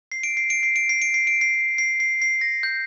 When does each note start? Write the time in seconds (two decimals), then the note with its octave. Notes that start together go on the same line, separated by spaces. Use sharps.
0.12 C7
0.23 D7
0.37 C7
0.50 D7
0.63 C7
0.76 D7
0.89 C7
1.02 D7
1.14 C7
1.27 D7
1.41 C7
1.78 C7
2.00 C7
2.22 C7
2.41 A#6
2.63 G6